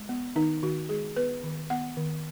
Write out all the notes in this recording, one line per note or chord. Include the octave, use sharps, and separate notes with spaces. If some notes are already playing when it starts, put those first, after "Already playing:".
Already playing: G#3
B3
D#3 D#4
D#3 F#4
G#3 G#4
B3 B4
D#3
B3 F#5
D#3